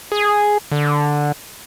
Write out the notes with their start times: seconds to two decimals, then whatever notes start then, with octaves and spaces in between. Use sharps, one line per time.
0.12 G#4
0.72 D3